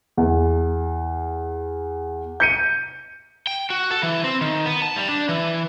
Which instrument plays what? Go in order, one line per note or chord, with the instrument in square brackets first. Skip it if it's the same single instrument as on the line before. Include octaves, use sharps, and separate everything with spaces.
[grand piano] E2
G6 C#7 D#7
[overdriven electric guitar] G5
F#4
A4
E3
C4
D#3
B3
A5
G3
D4
E3